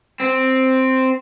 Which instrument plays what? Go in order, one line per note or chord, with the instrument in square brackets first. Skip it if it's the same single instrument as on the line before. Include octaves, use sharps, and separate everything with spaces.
[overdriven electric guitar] C4